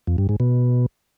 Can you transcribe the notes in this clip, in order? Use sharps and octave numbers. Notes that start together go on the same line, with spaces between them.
F2
G2
G#2
B2